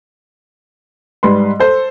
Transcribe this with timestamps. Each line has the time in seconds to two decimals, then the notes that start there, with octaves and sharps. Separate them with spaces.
1.23 G#2 G3 B4 C6
1.60 A4 C5